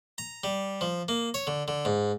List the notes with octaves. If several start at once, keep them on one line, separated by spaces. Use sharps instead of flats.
A#5
G3
F3
A#3
C#5
D3
D3
G#2